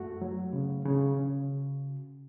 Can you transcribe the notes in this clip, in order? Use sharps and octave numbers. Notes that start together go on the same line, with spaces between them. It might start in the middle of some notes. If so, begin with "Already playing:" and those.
Already playing: F#2 A3 F#4
F#3
C#3
C#3
C#3